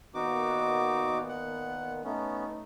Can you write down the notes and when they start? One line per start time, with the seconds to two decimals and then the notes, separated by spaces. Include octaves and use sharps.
0.14 A#2 D#3 B3 D#4 F#4 D6
1.29 F#5
2.04 A3 B3 C#4 D#4